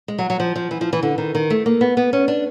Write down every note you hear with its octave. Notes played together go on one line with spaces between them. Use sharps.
G#3
F#3
F#3
F3
F3
E3
F3
E3
D3
D#3
D#3
A3
A#3
B3
B3
C#4
D4